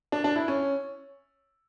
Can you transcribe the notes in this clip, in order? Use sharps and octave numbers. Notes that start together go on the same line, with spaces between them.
D4
D4
E4
C#4